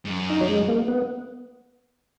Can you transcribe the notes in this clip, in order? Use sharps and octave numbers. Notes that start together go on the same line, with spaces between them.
G#2
F#2
D#4
F#3
G#3
A#3
B3